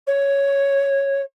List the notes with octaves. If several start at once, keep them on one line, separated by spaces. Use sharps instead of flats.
C#5